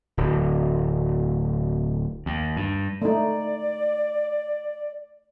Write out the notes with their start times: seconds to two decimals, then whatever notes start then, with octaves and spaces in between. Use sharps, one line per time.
0.17 D1
2.26 D#2
2.57 G2
3.02 A3 D#4 D5